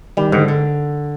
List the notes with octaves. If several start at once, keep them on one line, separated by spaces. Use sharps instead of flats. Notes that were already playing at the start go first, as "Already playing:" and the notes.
D#3 G3
G#2 D3
D3